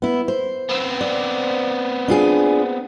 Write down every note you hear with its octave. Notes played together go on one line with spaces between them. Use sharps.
B3 E4
C5
B3 C4
D5
D4 F4 G#4